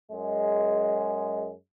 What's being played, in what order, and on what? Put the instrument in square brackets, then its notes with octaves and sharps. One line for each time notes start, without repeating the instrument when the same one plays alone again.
[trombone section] F#2 G#3